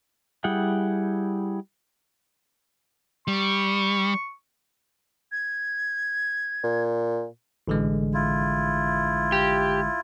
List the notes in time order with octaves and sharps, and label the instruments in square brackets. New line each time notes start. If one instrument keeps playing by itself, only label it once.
[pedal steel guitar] G3 E4 G#4 F#5 G5
[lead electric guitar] G3 [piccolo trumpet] C#6
[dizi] G#6
[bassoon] A#2
[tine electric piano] A1 D3 G#3
[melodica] E4 F4
[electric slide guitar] G4